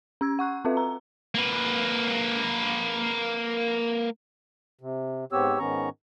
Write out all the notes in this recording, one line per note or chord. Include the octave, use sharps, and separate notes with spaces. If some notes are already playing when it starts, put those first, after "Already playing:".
C#4 E6 G#6
F#5 C#6 F#6
C4 F4 A4 B4 E5
A#5
A#3 B4
C3
G#2 B3 C4 G4 C#5 E6
G#2 D#3 B3 C#4 A#5 C#6